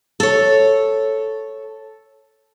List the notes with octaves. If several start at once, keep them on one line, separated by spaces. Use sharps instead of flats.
A4 C#5